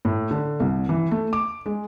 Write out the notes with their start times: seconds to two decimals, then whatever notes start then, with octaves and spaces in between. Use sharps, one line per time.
0.05 A2
0.31 D3
0.60 C2
0.89 E3
1.11 A3
1.33 D6
1.66 G#3